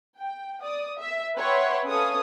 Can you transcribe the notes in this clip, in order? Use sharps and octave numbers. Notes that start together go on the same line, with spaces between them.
G5
D5 D#6
E5
B4 C#5 E5 F#5 G5 C6
C#4 A4 B4 C#5 F5 D#6